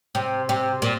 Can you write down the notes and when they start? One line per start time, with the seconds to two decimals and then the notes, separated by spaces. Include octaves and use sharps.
0.15 C3
0.49 C3
0.82 A#2